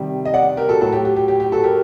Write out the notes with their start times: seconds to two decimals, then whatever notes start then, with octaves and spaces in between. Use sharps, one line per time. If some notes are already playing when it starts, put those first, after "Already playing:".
Already playing: C3 D#3 G3
0.25 D#5
0.34 D5 F#5
0.57 G4 A#4
0.69 F#4 A4
0.81 A2 F#3 F#4 A4
0.92 G4
1.05 G4
1.16 G4
1.28 G4
1.40 G4
1.52 F#4 A4
1.64 G4 A#4